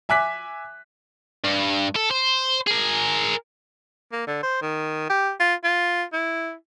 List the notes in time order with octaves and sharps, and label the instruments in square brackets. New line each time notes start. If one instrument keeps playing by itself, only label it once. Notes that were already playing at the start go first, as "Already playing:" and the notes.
[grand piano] E5 G#5 D6 F#6 B6
[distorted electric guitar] G2
A4
C5
G#4 A#4
[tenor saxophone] A#3
D3
C5
D#3
G4
F4
F4
E4